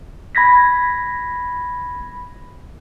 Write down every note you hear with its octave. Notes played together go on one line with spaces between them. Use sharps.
B5 G#6 A#6 B6